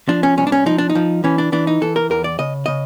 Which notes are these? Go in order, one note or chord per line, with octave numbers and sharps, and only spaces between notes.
F3 D4
C#4
C2 C#4
D4
C#4
F3 D#4
D4
D#4
F3
E3 C#4
D4
E3 D4
D#4
E3 A4
A#4
E2 A#4
D5
C#3 D#5
C#3 D#5